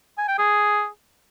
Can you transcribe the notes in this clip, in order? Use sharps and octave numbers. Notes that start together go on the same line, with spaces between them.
G#5
G5
G#4